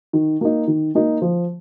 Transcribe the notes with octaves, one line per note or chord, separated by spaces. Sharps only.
D#3
A#3 D#4
D#3
A#3 D#4
F3